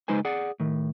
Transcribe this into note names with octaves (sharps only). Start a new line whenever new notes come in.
C#2 G#3 D#4 B4 C5 G#5
G#4 D5 F#5
A2 D#3